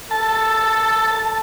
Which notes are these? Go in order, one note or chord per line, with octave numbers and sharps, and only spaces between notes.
A4 A5